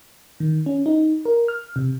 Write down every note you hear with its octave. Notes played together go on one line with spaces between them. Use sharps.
D#3
C#4
D#4
A#4
F6
C3